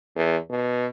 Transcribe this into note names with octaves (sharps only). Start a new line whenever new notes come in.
E2
B2